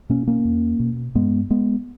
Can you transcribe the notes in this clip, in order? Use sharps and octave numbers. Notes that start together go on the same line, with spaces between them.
B2 A#3 C#4
A#3 C#4
E2
B2
G2 G#3 B3
G#3 B3